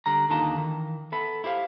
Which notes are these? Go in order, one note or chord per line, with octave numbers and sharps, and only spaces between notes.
D3 G3 A#5
D#2 D3 D#4 F4 A5 A#5
D#3 E3
B3 A4 E5 B5
E4 G4 C5 F5